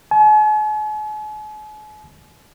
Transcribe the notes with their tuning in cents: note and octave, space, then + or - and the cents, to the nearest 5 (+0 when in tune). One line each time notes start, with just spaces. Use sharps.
G#5 +45